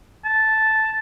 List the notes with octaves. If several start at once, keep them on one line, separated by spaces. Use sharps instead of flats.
A5